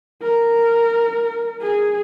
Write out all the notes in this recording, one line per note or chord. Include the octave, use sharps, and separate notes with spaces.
A#4
G#4